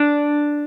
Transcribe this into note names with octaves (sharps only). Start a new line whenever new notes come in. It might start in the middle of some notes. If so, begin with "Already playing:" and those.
Already playing: D4